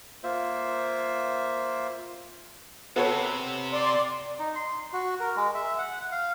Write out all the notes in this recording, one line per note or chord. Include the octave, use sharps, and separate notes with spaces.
A#3 F4 C5 E5
C3 B3 A4 C#5
D5 C6
D#4
C6
F#4
A#4
G#3
E5
F#5
F5